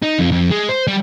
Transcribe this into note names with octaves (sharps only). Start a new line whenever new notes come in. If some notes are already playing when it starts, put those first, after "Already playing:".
D#4
F2
F2
G#3
C5
G3